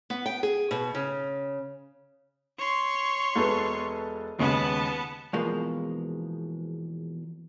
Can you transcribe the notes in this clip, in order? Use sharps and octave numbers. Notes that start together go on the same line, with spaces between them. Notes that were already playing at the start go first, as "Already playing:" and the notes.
B3
G5
G#4
B2
C#3
C#5 C6
E1 A4 B4
D#2 C#3 G#3 B3 A5
E2 B2 F3 G#3 A#3